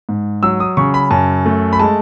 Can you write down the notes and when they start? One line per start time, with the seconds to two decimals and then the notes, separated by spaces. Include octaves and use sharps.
0.09 G#2
0.43 F#3 E6
0.60 D#6
0.77 C#3 C#6
0.94 B5
1.11 F#2 A5
1.46 A3
1.73 B5
1.79 G#3 A5